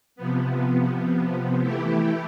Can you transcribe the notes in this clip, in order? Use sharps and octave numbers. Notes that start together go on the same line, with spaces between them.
C3 F3 B3
E3 A3 E4 G4